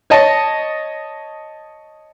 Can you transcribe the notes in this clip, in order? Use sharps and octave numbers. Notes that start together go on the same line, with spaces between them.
C#5 D#5 A5